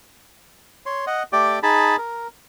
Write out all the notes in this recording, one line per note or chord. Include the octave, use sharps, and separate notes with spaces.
C#5 C6
D#5 F#5
A3 G4 D5 G5 D6
D#4 G#4 A5 B5
A#4